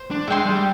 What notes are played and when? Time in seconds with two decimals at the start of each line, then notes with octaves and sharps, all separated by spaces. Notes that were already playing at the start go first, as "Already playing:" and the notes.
Already playing: C5
0.11 D4
0.28 G#3 E5 G5 C6
0.46 G3